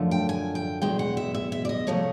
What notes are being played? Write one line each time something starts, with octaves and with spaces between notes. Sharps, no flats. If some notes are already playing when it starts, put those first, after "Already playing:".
Already playing: F#2 D3 F3 A3
G5
G#5
G5
E2 B2 G#3 G5
F#5
E5
E5
E5
D5
D#5
C3 F3 A3 C#5